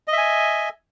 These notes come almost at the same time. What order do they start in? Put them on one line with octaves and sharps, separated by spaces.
D#5 E5 G#5